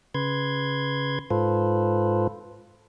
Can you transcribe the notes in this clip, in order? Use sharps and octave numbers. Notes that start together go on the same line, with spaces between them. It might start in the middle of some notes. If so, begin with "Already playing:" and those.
C#3 B4 C6 G#6
G#2 F4 A4 B4 C5